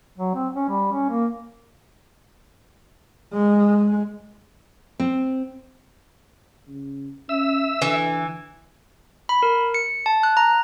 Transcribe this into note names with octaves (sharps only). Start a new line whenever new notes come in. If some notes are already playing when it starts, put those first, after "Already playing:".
F#3
C4
C#4
G3
C#4
A#3
G#3
C4
C#3
C#4 E5 E6
D3 E3
B5
A#4
C#7
A5
F#6
A#5